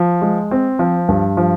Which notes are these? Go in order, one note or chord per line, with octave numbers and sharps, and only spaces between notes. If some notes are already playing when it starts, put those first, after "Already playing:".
Already playing: F3
G#3
C4
F3
G2
F3